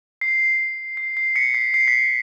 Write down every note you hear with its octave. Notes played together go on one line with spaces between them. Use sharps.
C7
C7
C7
B6 C#7
C7
C7
B6
C7